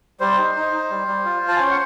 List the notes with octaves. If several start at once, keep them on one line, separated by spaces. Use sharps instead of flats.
G3 C5
D#4
D#4
D#4
G3
G3
F4
F4
A5
G#5
C#4 G5
F#5